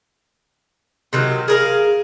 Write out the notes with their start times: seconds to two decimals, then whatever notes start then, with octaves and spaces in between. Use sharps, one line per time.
1.13 C3 D#3 F#3
1.48 G#4 A#4 F5